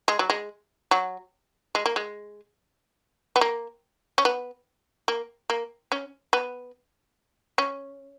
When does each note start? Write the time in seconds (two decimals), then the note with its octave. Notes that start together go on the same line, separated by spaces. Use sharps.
0.08 G#3
0.19 F#3
0.30 G#3
0.91 F#3
1.75 G#3
1.86 A#3
1.96 G#3
3.36 B3
3.41 A#3
4.18 C#4
4.25 B3
5.08 A#3
5.50 A#3
5.92 C#4
6.33 B3
7.58 C#4